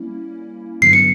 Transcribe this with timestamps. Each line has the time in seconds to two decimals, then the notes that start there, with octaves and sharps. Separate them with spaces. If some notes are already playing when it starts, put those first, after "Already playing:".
Already playing: G3 A#3 C#4 E4
0.82 G2 D3 F#3 B3 C7
0.93 C#7